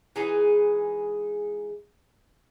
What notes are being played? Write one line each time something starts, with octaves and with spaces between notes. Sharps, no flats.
E3 G#3 D#4 G#4